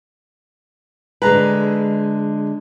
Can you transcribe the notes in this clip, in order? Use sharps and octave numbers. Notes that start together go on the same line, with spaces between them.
D3 G#3 B4 A#5